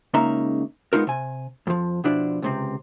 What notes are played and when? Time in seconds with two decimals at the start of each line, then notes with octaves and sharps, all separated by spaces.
0.14 C#2 C#3 A#3 D#4 E5 A#5
0.93 G#3 B3 D#4 F4 A#4
1.07 C3 G#5
1.67 F2 F3
2.04 B2 F3 D4 E4 D5
2.42 C#2 C3 C4